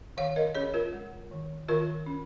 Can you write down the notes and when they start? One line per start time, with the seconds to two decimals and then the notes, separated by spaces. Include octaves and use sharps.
0.17 D#3 C#5 F5
0.36 A#4 D#5
0.55 C#4 G#4 C#5
0.74 F4 A#4
0.93 G#3
1.31 D#3
1.68 D#3 F4 A#4
2.06 C#4